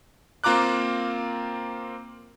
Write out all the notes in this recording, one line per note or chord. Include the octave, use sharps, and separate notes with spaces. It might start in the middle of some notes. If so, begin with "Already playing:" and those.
A#3 C4 F4 A#5 D6 F#6